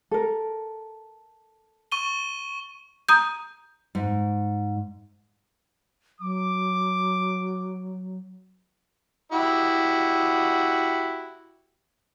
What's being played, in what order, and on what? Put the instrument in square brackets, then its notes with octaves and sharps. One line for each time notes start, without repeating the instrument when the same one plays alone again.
[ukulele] A4 A#4
[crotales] C#6 D#7 G7
[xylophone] A#5 D#6 G6
[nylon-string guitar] G#2
[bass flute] F#3 [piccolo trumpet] D6
[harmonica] E4 F#4 G4